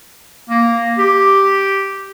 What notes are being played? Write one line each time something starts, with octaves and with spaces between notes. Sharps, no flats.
A#3
G4